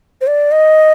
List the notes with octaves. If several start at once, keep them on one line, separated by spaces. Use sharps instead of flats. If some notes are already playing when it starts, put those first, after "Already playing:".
C5
D5
D#5